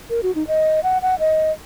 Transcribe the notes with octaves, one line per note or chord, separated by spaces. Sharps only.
A#4
F#4
D#4
D#5
F#5
F#5
D#5